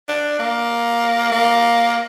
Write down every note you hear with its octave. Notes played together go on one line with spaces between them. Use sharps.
D4
A#3
A#3